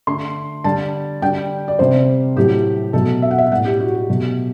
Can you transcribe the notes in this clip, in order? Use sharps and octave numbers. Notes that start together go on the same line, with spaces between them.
D3 A3 C6
D3 G3 A5
D3 G3 G5
D5
C3 G3 C5
A2 F#3 A3 G4
B2 F#3 A3 A4
E5
F#5
E5
A2 G3 F#5
G4
F#4
G4
B2 F#3 A3